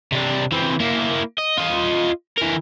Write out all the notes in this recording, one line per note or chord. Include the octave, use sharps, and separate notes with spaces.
C3 D4
E3 C4
A#3 E4
D#5
F4 D#5
E3 A#4